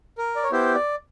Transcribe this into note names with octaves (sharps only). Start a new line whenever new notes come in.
A#4
D5
C#5
B3 E4 G4 C5
D5